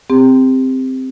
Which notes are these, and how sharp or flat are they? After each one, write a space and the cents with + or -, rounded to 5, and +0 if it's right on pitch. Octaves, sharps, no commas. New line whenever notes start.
C4 -5 G4 +30